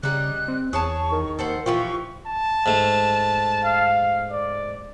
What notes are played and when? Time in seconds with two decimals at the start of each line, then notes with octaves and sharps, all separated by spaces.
0.03 C#3 G3 D#4 F#6
0.48 C4
0.73 E2 G#4 C#5 A5 C#6
1.12 D#3
1.39 D#2 A4 C5 F#5
1.66 A#2 E3 F3 F4 G4 C#6
2.27 A5
2.66 G#2 A3
3.64 F5
4.31 D5